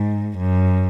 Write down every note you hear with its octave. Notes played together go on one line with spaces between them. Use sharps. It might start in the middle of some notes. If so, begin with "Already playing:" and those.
Already playing: G#2
F#2